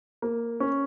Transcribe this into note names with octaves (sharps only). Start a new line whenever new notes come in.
A#3
C#4